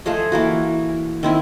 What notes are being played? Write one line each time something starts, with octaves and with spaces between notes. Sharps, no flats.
F3 A3 G#4 D#5
E3 A#3 F#4
D#3 C4 E4